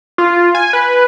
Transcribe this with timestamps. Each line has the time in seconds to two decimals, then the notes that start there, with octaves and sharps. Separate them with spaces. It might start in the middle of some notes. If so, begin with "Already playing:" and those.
0.18 F4
0.55 G#5
0.73 B4